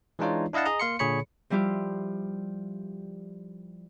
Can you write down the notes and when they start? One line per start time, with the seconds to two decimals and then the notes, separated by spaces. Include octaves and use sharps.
0.19 E3 G#3 D4 D#4 F4 C#5
0.53 D4 E4 D#5 F5 F#5 A5
0.66 G#4 D#5 A#5
0.80 A#3 F5 C6 C#7
0.99 A#2 D3 G#4 C#5 B5 C#7
1.50 F3 G3 E4 F4 G4